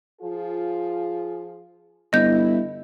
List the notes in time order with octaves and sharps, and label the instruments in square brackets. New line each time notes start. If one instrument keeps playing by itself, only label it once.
[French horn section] F3 F4 G#4
[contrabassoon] G1 [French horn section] E4 [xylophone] D#5 G6